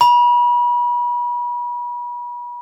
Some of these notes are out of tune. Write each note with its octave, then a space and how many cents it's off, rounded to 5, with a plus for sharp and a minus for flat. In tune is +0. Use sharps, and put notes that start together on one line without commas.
B5 -35